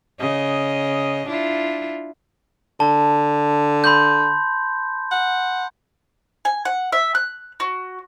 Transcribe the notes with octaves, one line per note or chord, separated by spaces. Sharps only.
C#3 D#5
D4 E4 F4
D3 A5
B5 C6 G6
F#5
G#5
F#5
E5
F#6
F#4